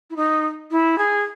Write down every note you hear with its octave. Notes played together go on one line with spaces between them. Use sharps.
E4
D#4
E4
G#4